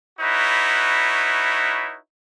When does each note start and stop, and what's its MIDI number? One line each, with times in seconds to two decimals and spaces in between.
0.19 1.96 63
0.19 1.96 64
0.19 1.96 66
0.19 1.96 71
0.19 1.96 73